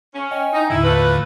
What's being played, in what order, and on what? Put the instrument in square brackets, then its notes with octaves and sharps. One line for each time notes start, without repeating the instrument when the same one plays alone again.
[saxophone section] C#4
[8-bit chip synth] D#5 G5 G#5
[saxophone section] D#4
[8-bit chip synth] D#2 A2 D3 [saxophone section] E4
[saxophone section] A3 F4 B4